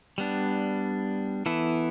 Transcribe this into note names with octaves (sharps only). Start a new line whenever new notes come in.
G3 B3 D4
E3 B3 E4 A4